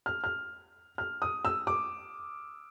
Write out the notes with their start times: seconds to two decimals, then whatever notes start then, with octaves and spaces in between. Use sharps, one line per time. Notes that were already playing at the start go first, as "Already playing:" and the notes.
0.06 F6
0.24 F6
0.98 F6
1.22 D#6
1.45 E6
1.67 D6